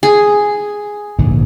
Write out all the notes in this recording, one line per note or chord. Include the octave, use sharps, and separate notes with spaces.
G#4
A#1 G#2 D3